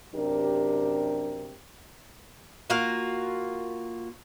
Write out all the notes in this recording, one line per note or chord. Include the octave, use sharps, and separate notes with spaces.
F#2 C3 D4 G4 A#4
A#3 F4 F#4